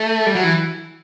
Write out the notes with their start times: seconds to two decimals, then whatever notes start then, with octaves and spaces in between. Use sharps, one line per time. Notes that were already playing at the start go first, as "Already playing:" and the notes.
Already playing: A3
0.26 G3
0.35 F#3
0.44 E3